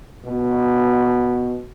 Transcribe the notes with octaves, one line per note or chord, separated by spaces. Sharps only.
B2